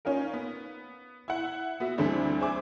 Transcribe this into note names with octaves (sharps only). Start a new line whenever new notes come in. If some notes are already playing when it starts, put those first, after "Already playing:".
C#4 D#4 F4 A#4
B3
E4 F#5
B3 F#4 E5
D2 D3 E3 G3 C4 D4
G#4 C5 E5 D6